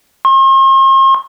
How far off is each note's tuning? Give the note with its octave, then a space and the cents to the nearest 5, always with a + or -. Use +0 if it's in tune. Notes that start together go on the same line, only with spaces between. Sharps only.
C6 +45